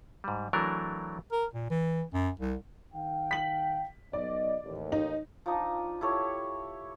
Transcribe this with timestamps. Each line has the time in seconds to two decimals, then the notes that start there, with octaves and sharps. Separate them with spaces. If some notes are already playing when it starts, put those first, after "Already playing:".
0.24 G#2 G3
0.53 E3 F#3 A3 D4 A#4
1.32 A#4
1.54 A#2
1.71 E3
2.14 F#2
2.40 C2
2.93 D#3 F5 G5
3.31 B6 F#7
4.13 B1 D5 D#5
4.63 A1 D#2
4.92 D#4
5.46 F3 D4 D#4 D#6
6.01 E4 G4 A4 C#5